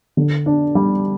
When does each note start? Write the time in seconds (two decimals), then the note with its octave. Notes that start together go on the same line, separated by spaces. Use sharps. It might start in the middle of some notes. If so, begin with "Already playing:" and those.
0.17 D3
0.46 D4
0.75 G3